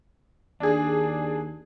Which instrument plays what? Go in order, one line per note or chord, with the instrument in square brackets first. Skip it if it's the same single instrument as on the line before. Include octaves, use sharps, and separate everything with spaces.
[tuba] D#2 [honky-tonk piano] D4 G#4